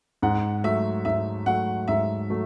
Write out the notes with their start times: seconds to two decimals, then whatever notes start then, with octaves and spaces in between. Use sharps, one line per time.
0.23 G#2 F#5
0.64 F#3 A3 E5
1.05 G#2 E5
1.46 F#3 A3 F#5
1.88 G#2 E5
2.30 F#3 A3